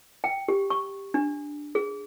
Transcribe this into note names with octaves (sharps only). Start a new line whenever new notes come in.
G5
G4
C#6
D4
G#4